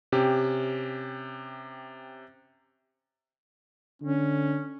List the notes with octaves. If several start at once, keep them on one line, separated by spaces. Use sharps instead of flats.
C3 C#4 G4
D3 C#4